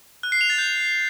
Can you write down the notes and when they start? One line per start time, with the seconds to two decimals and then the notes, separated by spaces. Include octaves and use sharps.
0.23 F#6
0.32 C7
0.41 F7
0.50 A6
0.58 G6